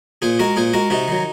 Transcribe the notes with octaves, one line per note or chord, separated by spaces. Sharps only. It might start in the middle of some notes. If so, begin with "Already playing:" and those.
A#2 G#4 C5
G#3 F#4 A#4
A#2 G#4 C5
G#3 F#4 A#4
C3 D#4 F#4
D#3 F#3